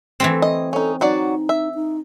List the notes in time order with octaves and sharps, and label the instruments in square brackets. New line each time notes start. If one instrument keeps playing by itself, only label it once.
[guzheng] E3 A3 C4
[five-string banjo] D#5
[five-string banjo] C#4 D#4 [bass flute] A4
[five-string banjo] F#3 F#4 D5 [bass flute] D#4
[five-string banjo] E5
[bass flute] D#4